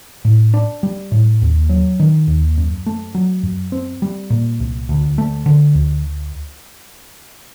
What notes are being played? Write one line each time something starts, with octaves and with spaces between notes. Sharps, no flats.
A2
D4
G3
A2
D#2
F#3
D#3
D#2
F#2
A3
F#3
F#2
C4
G3
A#2
C2
D2
A3
D3
D2